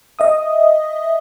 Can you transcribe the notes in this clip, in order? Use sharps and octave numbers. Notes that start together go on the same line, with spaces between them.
D#5 E5 D#6